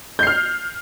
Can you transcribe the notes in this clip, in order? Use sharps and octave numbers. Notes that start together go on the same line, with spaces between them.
F6 G6 C7